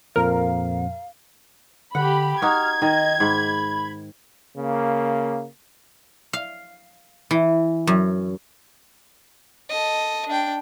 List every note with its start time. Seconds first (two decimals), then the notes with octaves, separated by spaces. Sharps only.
0.16 F2 A#2 F3 A#4 F5
1.95 D3 G4 F#5 B5
2.42 D#4 F#4 F6 G#6
2.82 D#3 D#5
3.20 G#2 B5
4.56 C#3 A#3
6.33 F5
7.31 E3
7.87 F#2
9.70 A4 D#5
10.28 D4 G5